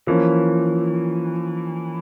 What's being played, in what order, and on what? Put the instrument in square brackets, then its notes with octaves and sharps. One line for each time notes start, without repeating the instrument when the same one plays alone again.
[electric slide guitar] E3 [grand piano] F3 A#3 C#4